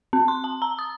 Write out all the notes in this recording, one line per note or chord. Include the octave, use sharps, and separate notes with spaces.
C4
C6
A5
A#5
D#6